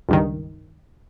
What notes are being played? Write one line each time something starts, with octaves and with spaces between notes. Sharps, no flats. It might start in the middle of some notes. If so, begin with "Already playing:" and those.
C#2 G2 D#3